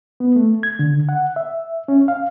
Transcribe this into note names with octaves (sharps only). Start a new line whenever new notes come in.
B3
A3
G#6
D3
F#5
E5
C#4
F5